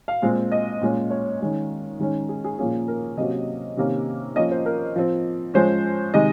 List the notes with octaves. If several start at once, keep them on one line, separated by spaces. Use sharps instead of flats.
F5
A#2 G#3 C4
D#5
A#2 G#3 C#4
C#5
D#3 G#3 C#4
D#3 G#3 C#4
G#4
G#4
A#2 F3 A#3 C#4 G#4
A#4
C3 F#3 A#3 C#4 D#5
C3 D#3 A#3 C#4
F3 A#3 C#4 D#5
C5
A#4
F3 C4
F3 G#3 C#4 C5
C3 D#3 G#3 D#5